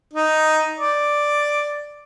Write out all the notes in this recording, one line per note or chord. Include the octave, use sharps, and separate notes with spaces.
D#4
D5